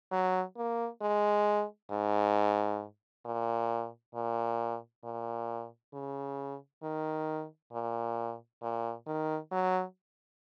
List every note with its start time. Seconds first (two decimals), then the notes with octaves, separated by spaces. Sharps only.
0.12 F#3
0.57 A#3
1.02 G#3
1.91 G#2
3.26 A#2
4.15 A#2
5.04 A#2
5.94 C#3
6.83 D#3
7.73 A#2
8.62 A#2
9.07 D#3
9.52 F#3